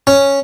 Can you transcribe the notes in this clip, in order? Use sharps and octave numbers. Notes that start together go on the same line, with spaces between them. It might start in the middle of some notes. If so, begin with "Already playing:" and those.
C#4